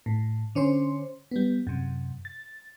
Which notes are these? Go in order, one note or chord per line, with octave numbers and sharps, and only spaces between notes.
A2
D3 C#4 C5 C6
G3 B3
F#2 C3
A6